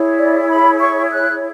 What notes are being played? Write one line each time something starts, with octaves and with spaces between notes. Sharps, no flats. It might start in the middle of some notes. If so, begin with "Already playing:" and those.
Already playing: E4 G#4 C#5
D5
B5
C#6
F#6